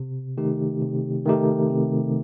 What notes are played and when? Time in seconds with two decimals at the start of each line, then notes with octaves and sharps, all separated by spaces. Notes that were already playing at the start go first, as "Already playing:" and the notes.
Already playing: C3
0.38 D#3 A3 D#4 G4
0.81 C3
1.26 D#3 A3 D#4 G4
1.69 C3